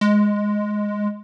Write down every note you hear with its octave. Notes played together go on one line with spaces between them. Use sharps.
G#3